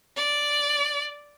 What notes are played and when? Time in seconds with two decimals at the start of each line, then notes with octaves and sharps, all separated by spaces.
0.16 D5